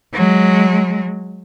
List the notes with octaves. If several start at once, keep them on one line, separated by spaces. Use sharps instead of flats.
F#3 G#3